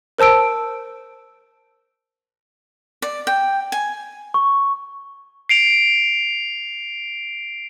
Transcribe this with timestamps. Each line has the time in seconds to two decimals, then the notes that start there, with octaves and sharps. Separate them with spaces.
0.18 A#4 C5 A5 E6 D7
3.02 D5
3.27 G5
3.72 G#5
4.34 C#6
5.49 C7 D7 F7